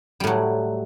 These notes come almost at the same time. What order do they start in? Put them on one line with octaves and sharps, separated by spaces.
G3 A2 F#3